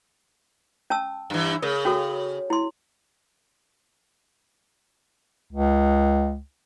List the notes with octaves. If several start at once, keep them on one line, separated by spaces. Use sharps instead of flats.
C#4 A5 E6
G2 E3
C#3 A#4
C#4 F#4 A4
E4 C6
C#2